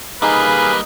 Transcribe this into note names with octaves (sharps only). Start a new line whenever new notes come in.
G3 A#3 D#4 G#4 B4 F5